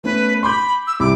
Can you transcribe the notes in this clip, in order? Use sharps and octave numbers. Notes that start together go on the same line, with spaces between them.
A3 B3 C#4 B4
B5 C6 D6 G6
E6
C2 E4 B5 D6